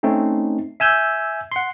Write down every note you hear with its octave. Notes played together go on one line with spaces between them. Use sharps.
A3 C4 C#4 D#4
E5 G#5 E6 G6
F#5 C6